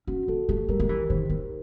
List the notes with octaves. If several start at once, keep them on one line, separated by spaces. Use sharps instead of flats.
C#4 F#4
B3 A4
A3 G4
G3 A#4
G#3
E3 G4
D#3 C5
D#3 A#4